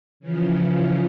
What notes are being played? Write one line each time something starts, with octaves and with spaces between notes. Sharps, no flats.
C#3 E3 F3 C#4